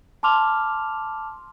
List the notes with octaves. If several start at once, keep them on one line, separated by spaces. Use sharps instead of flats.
A5 C6 D6 F6 F7